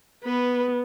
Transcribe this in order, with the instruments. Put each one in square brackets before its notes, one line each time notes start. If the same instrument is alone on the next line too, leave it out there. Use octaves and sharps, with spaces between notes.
[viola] B3 [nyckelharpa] B4